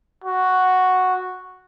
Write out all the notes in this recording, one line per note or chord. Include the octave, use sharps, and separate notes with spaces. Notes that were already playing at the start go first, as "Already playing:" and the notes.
F#4